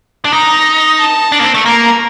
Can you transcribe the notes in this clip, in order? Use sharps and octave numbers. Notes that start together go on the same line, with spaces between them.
D4
D#4 A#5
A5
D4
A#3
C4
A3
A#3 A#5